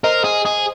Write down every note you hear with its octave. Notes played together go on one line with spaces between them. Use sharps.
A#4 C5 D#5
G#4
G#4